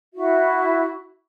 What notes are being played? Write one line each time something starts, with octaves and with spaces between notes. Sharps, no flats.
E4 F#4 E5